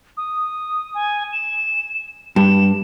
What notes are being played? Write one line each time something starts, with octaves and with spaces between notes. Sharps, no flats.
D#6
G#5
E7
G2 E7